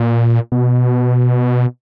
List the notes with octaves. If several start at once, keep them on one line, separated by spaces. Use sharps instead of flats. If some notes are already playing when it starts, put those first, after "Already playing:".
Already playing: A#2
B2